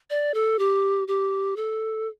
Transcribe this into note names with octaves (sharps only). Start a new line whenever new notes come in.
D5
A4
G4
G4
A4